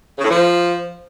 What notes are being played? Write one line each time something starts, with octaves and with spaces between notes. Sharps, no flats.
C#3
A2
F3